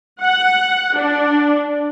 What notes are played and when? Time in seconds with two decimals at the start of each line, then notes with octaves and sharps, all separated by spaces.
0.22 F#5
0.97 D4